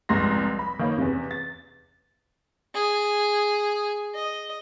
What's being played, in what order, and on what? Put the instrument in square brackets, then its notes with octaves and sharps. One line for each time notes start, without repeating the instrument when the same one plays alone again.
[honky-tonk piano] F1 C2 G#2 C6 A#6
B5
D#3 A#3 C#5
E2 C3
A6
[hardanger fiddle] G#4
D#5